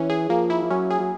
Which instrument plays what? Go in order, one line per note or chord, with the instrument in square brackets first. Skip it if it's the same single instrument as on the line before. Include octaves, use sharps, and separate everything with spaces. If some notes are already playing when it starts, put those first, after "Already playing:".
Already playing: [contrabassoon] E3 [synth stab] C#4
[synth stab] G#4
[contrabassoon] F3 [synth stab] A#3
[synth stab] E4
[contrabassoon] F3
[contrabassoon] F#3 [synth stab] C#4
[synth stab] G#4
[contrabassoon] F#3